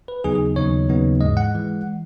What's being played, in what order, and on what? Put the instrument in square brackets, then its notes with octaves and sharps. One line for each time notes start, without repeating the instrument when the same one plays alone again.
[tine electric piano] B4
D#2 C#3 F#3 B3 D#4 G#4
G#4
D#2 C#3 F#3 B3 D#4 C#5
D#2 C#3 F#3 B3 D#4
G#2 E3 G#3 D#5
F#5
E3 G#3